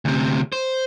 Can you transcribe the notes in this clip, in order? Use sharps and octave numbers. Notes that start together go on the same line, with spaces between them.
D2 C3
C5